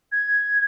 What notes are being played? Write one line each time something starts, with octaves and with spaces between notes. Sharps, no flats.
G#6